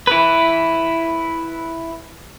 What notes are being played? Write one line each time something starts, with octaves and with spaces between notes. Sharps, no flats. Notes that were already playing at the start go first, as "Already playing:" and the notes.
E4 B4